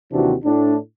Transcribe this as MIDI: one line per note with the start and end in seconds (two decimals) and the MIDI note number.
0.12 0.33 39
0.12 0.33 48
0.12 0.33 52
0.12 0.33 60
0.12 0.33 62
0.12 0.33 66
0.44 0.76 45
0.44 0.76 62